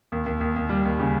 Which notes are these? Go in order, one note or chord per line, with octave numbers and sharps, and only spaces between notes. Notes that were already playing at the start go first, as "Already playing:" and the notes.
D#2
D#2
D#2
D#2
G3
D#2
C#3